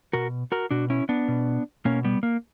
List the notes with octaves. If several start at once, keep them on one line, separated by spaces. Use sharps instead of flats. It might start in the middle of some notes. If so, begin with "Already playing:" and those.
B2 F#4 A#4
F#4 A#4
B2 D4 F#4
C#4 E4
B3 D4
B2
B2 A#3 C#4
G3 B3
A#3